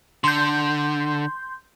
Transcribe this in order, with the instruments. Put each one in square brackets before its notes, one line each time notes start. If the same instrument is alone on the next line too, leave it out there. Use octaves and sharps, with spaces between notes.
[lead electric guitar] D3 [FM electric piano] C6 G6